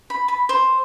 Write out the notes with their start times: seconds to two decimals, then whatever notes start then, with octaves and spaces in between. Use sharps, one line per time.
0.10 B5
0.28 B5
0.49 C5